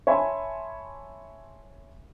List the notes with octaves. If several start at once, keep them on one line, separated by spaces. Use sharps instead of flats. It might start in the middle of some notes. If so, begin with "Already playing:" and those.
C#5 E5 G#5 A5 B5 C6